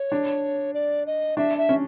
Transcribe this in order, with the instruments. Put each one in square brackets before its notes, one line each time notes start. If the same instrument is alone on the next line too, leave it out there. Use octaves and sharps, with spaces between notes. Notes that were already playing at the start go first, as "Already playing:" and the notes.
Already playing: [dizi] C#5
[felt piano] D4
[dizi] D5
D#5
[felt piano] D4 [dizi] E5
[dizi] E5
[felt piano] C#4